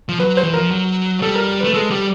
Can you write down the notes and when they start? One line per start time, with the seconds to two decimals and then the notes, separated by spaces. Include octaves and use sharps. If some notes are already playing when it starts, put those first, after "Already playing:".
0.09 F3
0.20 F#3 B4
0.37 C5
0.43 E3
0.54 F3 A#4
0.71 F#3
1.22 G3 A4
1.35 A#4
1.60 B4
1.64 A3
1.74 G#3 A4
1.90 G3 G4